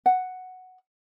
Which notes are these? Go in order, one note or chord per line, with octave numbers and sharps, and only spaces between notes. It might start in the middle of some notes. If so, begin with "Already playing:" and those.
F#5